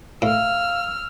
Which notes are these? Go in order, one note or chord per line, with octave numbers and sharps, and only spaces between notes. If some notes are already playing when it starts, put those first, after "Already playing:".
A2 F5 E6 F6